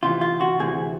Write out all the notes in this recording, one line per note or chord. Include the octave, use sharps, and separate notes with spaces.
D2 C3 E3 F4
F4
F#4
D2 C3 E3 G#4